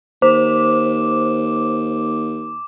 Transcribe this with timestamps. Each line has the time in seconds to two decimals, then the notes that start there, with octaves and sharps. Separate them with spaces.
0.22 D#2 C5 D6